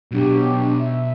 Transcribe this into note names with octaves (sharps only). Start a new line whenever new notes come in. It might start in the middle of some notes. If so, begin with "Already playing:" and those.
B1 B2 F#3 D4 G4
E5